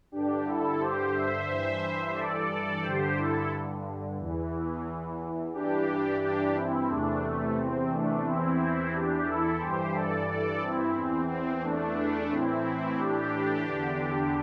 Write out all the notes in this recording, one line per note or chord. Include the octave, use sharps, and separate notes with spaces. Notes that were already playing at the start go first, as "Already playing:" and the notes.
G2 D3 D4 G4
E4 A4
G4 C5
C5 E5
G2 E3
A4 D5
G2 D3 G4 C5
E4 A4
E2 E3
G2 E3 D4 G4
D4 G4
C4 E4
E2 C3 E3 A3 D4
A3
C4
A3 D4
E2 E3 C4 E4
D4 G4
E4 A4
G2 E3 G4 C5
A4 D5
A4 D5
C4 E4
E2 E3 C4
C4
A3 D4
A2 E3 C4 E4
D4 G4
E2 D3